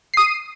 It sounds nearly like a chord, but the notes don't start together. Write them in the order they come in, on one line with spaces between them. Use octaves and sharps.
C7 D#6 D#7